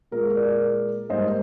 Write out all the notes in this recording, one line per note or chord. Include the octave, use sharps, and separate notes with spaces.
A#2 G#3 A#4
A#4 D5
G#2 G3 A#3 C5 D#5